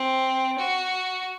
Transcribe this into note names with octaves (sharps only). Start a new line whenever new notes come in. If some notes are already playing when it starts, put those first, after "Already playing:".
Already playing: C4
F#4